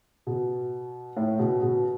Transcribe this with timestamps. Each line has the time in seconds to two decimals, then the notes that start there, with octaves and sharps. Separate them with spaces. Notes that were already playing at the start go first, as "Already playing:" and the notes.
0.27 B2
1.17 A2
1.39 B2
1.62 B2